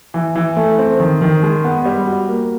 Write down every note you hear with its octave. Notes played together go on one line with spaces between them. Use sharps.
E3
E3
A3
C4
D#3
D#3
G#3
B3
G3
F#4
A#3